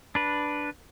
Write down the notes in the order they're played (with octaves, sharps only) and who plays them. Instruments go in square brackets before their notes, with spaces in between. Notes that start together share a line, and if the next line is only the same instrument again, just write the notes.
[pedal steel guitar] D4 B4